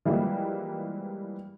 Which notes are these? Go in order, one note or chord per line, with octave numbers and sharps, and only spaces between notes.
E3 F3 G3 G#3 A#3